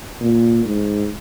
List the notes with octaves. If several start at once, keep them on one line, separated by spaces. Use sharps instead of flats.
A#2
G#2